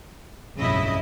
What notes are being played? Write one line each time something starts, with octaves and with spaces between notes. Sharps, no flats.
F1 B1 G2 C#3 E4 D#5